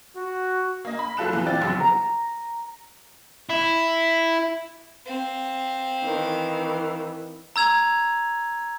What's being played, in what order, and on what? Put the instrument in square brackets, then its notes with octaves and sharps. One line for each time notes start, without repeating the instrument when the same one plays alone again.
[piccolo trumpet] F#4
[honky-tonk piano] A#3 D#5
B5
F#1 F#3 F4 A4 F#6 E7
A#2 E3
C4 F4 D5 G5 A6
A#1 F#2 C#3 F#3
[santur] A#5
[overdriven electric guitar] E4
[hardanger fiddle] C4 F5
[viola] D#3 E3
[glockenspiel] A#5 E6 G#6 F7